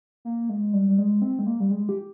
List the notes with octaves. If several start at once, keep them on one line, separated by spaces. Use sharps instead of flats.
A#3
G#3
G3
G3
G#3
C4
G#3
A#3
G3
G#3
G4